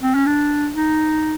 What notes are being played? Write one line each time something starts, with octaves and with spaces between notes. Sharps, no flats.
C4
C#4
D4
D#4